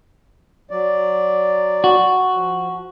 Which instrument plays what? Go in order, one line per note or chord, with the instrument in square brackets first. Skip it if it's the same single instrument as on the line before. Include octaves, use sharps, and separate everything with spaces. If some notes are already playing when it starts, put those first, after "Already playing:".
[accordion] F#3 D5
[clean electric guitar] F#4
[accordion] F3